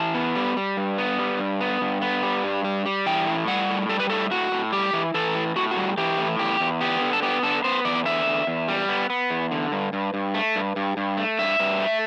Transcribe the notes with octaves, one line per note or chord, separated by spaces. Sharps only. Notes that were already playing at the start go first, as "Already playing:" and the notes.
Already playing: E3 A5
B3
G3
G3
G2
B3
G3
G2
B3
G2
B3
G3
G2
G3
G3
E3 G5
A2
G3 F#5
A2
G3 A4
B4
A2 A4
A2 F#4
A2
G3 G4
E3
E3 A4
A2
A2 F#4
F#4
G3
E3 G4
A2
E2 G4
E2
B3 G4
D3
A4
B3 G4
D3 A4
B3 C5
E2 D5
D3 E5
E2
E2
G3
B3
B3
E2
D3
G2
G2
G2
A3
G2
G2
G2
A3
G2 E5
G2
A3